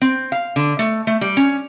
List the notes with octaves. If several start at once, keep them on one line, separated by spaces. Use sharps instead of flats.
C4
F5
D3
A3
A3
G3
C#4